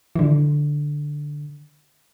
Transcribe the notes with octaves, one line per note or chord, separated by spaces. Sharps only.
E3
D3